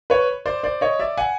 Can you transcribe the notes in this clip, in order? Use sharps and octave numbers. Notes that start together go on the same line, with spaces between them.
B4 C#5
C5 D5
C5 D5
C#5 D#5
D5 E5
F#5 G#5